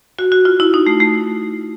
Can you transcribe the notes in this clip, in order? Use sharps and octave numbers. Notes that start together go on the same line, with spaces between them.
F#4
F#4
F4
E4
D#4
A3
A3